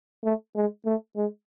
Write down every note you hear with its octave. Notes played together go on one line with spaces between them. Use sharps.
A3
G#3
A3
G#3